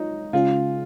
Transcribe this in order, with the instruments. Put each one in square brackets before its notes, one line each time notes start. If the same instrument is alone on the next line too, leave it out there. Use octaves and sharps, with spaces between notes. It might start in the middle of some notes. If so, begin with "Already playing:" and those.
Already playing: [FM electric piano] G#3 F4 C#5 [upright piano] D#4
[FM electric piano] C#3 G#3 C#4 G#4 [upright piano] F4